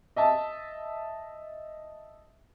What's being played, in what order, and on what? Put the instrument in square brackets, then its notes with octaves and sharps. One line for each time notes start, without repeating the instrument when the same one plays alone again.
[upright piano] D#5 E5 A5